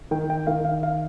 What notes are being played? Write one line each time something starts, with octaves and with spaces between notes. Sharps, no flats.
D#3 G5
G5
D#3 F5
F5
F5